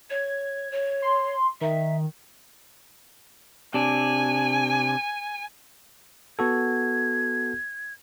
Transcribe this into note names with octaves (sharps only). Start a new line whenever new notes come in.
C#5 G#6
C#5
C6
D#3 E5
C3 D4 G#5
B3 F#4 A4 G#6